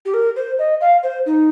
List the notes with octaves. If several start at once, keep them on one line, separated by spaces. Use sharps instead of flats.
G4
A#4
C5
D#5
F5
C5
D#4